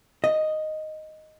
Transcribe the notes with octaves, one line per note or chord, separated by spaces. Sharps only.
D#5